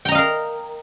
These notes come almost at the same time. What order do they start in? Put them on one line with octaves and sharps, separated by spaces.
G5 A#5 D#5 F5 A#4